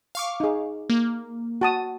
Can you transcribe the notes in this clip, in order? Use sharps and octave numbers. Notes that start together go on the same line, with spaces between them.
F5 C#6 D6
D#4 G#4
A#3
F#4 A5 D#6